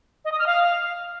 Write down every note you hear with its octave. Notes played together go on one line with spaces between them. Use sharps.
D#5
D#6
F6
F5